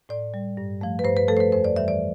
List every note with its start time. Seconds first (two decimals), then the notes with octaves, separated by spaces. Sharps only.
0.09 A2 D5
0.34 G3
0.57 G2
0.81 F3 A3
0.99 B4
1.05 G2 C5
1.17 B4
1.28 F3 A3 A4
1.37 C5
1.40 B4
1.52 F2 C5
1.64 D5
1.76 E3 G3 E5
1.88 D5